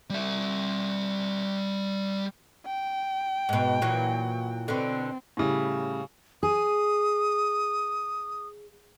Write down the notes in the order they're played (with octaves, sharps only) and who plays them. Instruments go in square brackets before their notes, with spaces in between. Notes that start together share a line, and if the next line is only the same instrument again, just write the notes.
[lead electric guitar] G3 E5
[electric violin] G5
[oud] G#2 B2
A#2 E3 F#3
[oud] B2 D3 [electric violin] C4
[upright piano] A2 C#3 G3
[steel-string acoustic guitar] G#4 [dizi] D#6